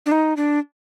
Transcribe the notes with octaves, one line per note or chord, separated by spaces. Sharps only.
D4
D#4
D4